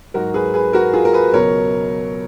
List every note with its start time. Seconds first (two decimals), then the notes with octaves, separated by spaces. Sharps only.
0.14 G#2 F#3 F#4 A#4
0.34 G#4 B4
0.54 G#4 B4
0.73 F#4 A#4
0.93 F4 G#4
1.05 A#4
1.13 G#4 B4
1.33 C#2 B2 F#3 A#4 C#5